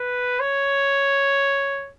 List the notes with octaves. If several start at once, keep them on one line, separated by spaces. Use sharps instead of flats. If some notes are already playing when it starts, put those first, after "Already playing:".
Already playing: B4
C#5